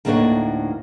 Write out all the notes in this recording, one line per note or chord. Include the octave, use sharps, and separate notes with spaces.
D2 A2 A#3 D4 D#4 C#5